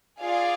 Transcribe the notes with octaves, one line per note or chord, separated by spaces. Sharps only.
F4 G#4 D5 F5